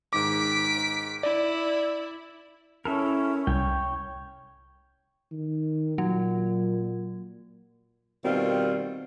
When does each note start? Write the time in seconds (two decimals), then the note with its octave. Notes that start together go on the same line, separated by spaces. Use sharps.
0.13 G#2 D#3 D6 B6 D7
1.23 E4 D5
2.85 C#4 E4 A4 A#4
3.47 C2 C#5 G5
5.31 D#3
5.98 A#2 F#3
8.25 B2 D#3 G3 C4 F4